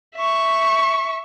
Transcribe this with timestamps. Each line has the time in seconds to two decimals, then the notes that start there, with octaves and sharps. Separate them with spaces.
0.15 E5 C#6